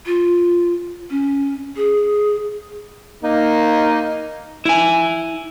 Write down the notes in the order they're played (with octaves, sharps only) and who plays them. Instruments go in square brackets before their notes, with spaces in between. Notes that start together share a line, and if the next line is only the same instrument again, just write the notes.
[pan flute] F4
C#4
G#4
[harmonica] A#3 D#4
[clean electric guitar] E4 G#5